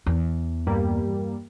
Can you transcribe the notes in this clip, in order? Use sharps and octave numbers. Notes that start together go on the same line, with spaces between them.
E2
G2 G3 A#3